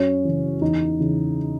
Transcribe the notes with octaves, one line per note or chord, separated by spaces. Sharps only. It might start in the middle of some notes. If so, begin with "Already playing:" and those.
Already playing: F#2 C#4
C#3 E3
E2 D#4
C#3 E3